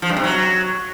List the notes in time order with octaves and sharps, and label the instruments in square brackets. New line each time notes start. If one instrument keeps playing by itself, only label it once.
[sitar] F3
G2
C3
F#3